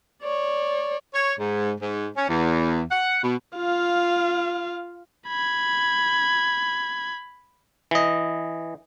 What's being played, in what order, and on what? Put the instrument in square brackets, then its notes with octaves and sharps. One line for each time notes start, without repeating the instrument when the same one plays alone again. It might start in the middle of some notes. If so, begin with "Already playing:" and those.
[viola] C#5 D5
[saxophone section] C#5
G#2
G#2
C#4
E2
F#5
B2
[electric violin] F4 F5
B5 G#6
[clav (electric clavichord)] E3 D#5